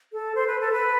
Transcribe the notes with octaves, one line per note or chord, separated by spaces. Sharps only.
A4
C5
B4
A4
B4